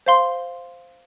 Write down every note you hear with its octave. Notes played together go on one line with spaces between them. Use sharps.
C5 F5 C6